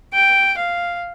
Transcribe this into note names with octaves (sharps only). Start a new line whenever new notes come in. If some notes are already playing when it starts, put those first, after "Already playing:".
G5
F5